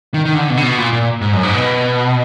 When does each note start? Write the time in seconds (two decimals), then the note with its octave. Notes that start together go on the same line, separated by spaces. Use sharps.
0.14 D#3
0.25 D#3
0.35 D3
0.50 B2
0.57 D3
0.63 B2
0.79 A#2
0.92 A#2
1.21 G#2
1.33 F#2
1.43 G#2
1.54 B2